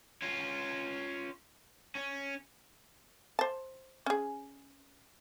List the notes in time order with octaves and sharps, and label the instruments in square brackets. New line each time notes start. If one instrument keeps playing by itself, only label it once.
[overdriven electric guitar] C#4 F4
C#4
[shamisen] C5 A5
C#4 G#4